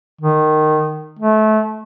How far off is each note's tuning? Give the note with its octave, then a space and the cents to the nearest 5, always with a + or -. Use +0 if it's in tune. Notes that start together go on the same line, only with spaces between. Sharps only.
D#3 -15
A3 -25